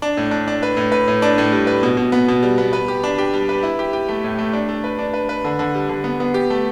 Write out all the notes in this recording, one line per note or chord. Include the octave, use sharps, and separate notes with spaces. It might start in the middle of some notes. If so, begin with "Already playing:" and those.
D4
A2
D4
D4
B4
A2
B4
A2
D4
A2
G3
B4
B2
B2
B3
B2
G3
B3
B4
G4
D4
G4
G3
B4
E4
G4
G4
A3
A2
A3
D4
A3
B4
D4
B4
B4
D3
D3
G3
D3
B3
B3
G4
A3